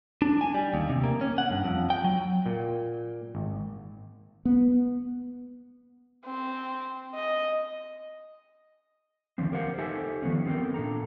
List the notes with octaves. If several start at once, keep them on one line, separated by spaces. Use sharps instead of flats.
D4
G#5
G3
D#2
C3
A#3
C#4
F#5
G2
F2
G5
F#3
A#2
G#1
B3
C4
D#5
D3 D#3 F3 C4
G4 A#4 C5 F5 F#5
D#4 G4 A4 C5 E5 G#5
D#3 F3 B3 C#4
B3 C4 A4 A#4 G5
A#2 D4 A4 A#5